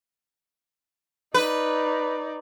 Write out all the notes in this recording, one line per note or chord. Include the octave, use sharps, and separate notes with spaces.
D#4 B4 D5